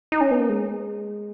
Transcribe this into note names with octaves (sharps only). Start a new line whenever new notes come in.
D#4
C#4
B3
A#3
G#3